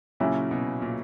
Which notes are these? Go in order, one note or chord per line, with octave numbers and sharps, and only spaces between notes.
A#2 C#3 F#3 C#4 E4
B2
A#2